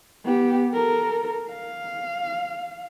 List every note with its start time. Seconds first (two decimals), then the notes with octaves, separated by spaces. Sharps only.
0.24 B3 G4
0.73 A4 A#4
1.49 F5